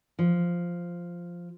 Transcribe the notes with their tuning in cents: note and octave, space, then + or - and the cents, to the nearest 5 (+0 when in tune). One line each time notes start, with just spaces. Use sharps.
F3 -5